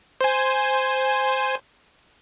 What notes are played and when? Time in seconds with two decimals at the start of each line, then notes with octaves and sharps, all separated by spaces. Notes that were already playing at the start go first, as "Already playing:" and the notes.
0.21 C5 G#5